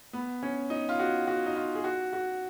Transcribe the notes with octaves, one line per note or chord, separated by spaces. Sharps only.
B3
C#4
D#4
F4
F#4
F#4
D#4
F4
G#4
F#4
F#4